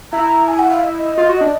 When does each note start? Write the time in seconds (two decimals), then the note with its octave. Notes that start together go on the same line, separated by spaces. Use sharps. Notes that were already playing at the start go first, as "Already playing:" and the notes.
0.12 E4 A#5
0.48 G#5
0.59 F#5
0.71 F5
0.83 D#5
1.18 F4
1.29 F#4
1.41 D4